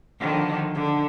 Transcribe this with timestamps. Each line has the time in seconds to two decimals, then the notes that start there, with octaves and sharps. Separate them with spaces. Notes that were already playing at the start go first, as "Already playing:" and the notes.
0.19 D3 D#3 F3
0.74 D3